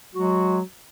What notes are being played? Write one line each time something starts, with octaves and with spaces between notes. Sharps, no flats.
F#3 G#3 F#4